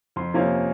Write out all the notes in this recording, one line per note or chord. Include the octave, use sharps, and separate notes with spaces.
F2 C6
C3 F3 A#3 C#4